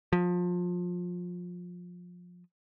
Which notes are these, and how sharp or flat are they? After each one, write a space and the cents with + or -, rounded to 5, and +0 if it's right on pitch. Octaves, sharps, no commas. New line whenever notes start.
F3 +25